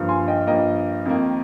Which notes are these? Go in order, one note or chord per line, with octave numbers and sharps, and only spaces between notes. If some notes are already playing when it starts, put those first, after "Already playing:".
Already playing: G2 F3 A#3
G#5 C6
D#5 G5
G2 F3 A#3 D#5 G5
F2 D#3 A#3